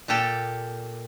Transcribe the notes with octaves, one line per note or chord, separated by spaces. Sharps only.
A#2 G4 A4 G5